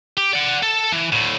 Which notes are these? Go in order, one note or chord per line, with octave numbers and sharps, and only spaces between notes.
G4
D5 F#5
A4
E3
D2 A2